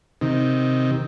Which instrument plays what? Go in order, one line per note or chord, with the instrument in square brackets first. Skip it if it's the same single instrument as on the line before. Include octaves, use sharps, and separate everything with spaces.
[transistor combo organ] C3 D#3